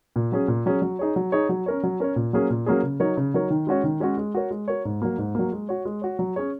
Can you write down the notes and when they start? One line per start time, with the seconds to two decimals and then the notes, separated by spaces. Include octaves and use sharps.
0.16 A#2
0.32 F#3 C#4 G#4
0.48 A#2
0.66 F#3 C#4 G#4
0.82 F#3
0.99 D#4 G#4 C#5
1.16 F#3
1.32 D#4 G#4 C#5
1.49 F#3
1.66 C#4 A#4 C#5
1.83 F#3
2.00 C#4 A#4 C#5
2.16 A#2
2.33 F#3 A#3 C#4 G#4
2.50 A#2
2.66 F#3 A#3 C#4 G#4
2.83 C#3
3.00 F#3 D#4 A#4 C#5
3.17 C#3
3.34 F#3 D#4 A#4 C#5
3.50 D#3
3.67 G#3 C#4 F#4 C#5
3.84 D#3
4.00 G#3 C#4 F#4 C#5
4.18 G#3
4.35 F#4 A#4 C#5
4.51 G#3
4.68 F#4 A#4 C#5
4.85 G#2
5.02 F#3 A#3
5.18 G#2
5.35 F#3 A#3
5.52 G#3
5.69 F#4 C#5
5.85 G#3
6.02 F#4 C#5
6.19 F#3
6.36 C#4 G#4 C#5